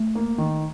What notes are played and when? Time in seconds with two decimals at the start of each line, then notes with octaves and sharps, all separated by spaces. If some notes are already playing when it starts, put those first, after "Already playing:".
Already playing: A3
0.15 A#3
0.38 D#3